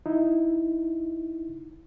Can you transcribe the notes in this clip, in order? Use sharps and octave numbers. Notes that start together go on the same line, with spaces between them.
D#4 E4